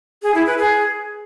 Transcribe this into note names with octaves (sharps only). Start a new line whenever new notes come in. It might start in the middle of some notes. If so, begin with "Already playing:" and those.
G#4
E4
B4
G#4